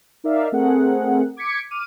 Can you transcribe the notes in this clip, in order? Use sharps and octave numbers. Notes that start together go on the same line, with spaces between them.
D#4 A#4 D5 E5 F5
A3 C4 G#4 A#4 F#5
D6 G#6 B6 C#7 D7
D6 F6 D#7